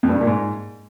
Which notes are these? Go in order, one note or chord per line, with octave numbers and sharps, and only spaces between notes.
F2
G2
C#3
A#2
G#2